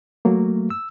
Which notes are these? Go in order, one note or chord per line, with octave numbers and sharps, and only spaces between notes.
F#3 A3 A#3
E6